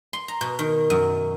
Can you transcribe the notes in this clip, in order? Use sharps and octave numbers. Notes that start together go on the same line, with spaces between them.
C6
A#5
B2
D#3
F#2